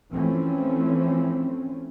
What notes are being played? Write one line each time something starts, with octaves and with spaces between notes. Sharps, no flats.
E3 F3 A3 C4 C#4